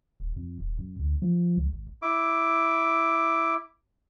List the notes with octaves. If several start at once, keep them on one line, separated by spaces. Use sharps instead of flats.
D#1
F2
D#1
F#2
D2
F3
C#2
G#1
E4 D6